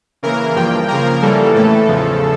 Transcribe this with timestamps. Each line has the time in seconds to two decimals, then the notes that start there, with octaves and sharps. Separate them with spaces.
0.23 C#3 E3 A#3 A#4
0.55 G2 F3 A#3 G5
0.88 C#3 F3 A#3 A#4
1.22 C#3 E3 G3 A#3 A4
1.55 A2 E3 A3 A4
1.88 E2 C#3 F3